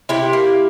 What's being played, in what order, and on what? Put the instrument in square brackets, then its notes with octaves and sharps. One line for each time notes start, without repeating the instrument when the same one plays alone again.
[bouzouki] C3 E4 G4
A#3